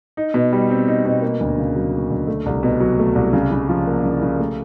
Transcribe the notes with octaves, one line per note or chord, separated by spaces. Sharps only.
D#4
B2
G3
C4
D#4
B2
A#3
D2
C#3
F#3
A#3
D2
A3
C2
B2
F#3
A3
C2
C#3
C#3
F3
A#3
C#3
C#3
A3